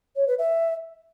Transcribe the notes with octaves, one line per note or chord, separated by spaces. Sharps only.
C#5
B4
E5